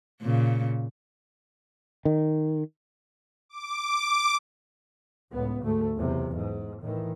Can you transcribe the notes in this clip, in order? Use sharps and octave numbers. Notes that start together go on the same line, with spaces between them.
A#2 C#3
D#3
D6
C#2 A2 B3
D2 G#2 A3
B1 E2 C3
G#2
A2 D#3 E3